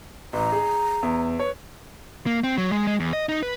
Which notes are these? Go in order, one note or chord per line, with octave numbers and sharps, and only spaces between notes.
A1 A#5
G#4
E2
B4 C#5
A#3
C4
F#3
G#3
G#3
E2
D#5
D#4
B4